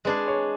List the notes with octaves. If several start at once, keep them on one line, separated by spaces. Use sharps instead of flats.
G#3 D4 G#4 B4
C#5